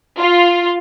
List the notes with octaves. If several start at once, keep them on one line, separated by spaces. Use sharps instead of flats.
F4